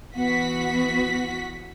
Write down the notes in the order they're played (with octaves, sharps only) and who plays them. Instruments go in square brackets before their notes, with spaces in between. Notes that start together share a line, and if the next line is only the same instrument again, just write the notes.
[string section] E3 F#4 B6 [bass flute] B3